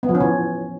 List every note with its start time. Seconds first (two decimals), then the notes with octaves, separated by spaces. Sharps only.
0.03 B3
0.09 F3
0.15 C#4
0.20 E3